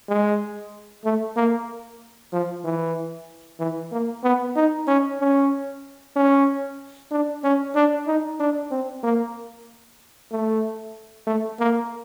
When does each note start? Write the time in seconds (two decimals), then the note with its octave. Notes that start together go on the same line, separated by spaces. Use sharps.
0.09 G#3
1.05 A3
1.36 A#3
2.33 F3
2.64 E3
3.60 E3
3.92 A#3
4.24 B3
4.56 D#4
4.88 C#4
5.20 C#4
6.16 C#4
7.11 D4
7.44 C#4
7.75 D4
8.07 D#4
8.40 D4
8.71 C4
9.03 A#3
10.31 A3
11.27 A3
11.59 A#3